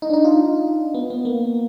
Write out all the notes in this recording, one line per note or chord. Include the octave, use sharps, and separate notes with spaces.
D#4
D4
D#4
F4
D#4
B3
B3
A#3